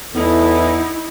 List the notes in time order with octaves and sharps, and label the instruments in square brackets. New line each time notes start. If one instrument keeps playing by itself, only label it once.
[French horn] E2 [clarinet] B3 [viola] D#4 E4 [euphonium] A4